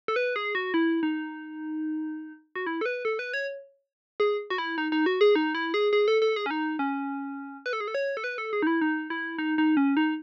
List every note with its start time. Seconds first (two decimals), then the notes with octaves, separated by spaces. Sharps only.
0.08 A4
0.16 B4
0.36 G#4
0.55 F#4
0.74 E4
1.03 D#4
2.55 F#4
2.66 E4
2.81 A4
2.86 B4
3.05 A4
3.19 B4
3.33 C#5
4.20 G#4
4.50 F#4
4.58 E4
4.78 D#4
4.92 D#4
5.06 F#4
5.21 G#4
5.35 D#4
5.55 E4
5.74 G#4
5.93 G#4
6.08 A4
6.22 A4
6.36 G#4
6.46 C#4
6.51 D#4
6.79 C#4
7.66 B4
7.73 A4
7.80 G#4
7.88 A4
7.95 C#5
8.17 A4
8.24 B4
8.38 A4
8.53 G#4
8.62 D#4
8.67 E4
8.81 D#4
9.10 E4
9.38 D#4
9.58 D#4
9.77 C#4
9.97 D#4